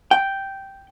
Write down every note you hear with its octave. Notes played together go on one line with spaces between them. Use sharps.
G5